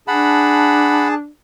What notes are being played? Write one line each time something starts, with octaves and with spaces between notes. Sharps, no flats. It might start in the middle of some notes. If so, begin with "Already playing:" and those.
D4 G#4 F#5 A5 B5